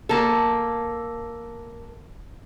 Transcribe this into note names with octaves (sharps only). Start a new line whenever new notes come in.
A#3 A4